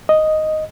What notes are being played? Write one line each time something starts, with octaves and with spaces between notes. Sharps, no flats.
D#5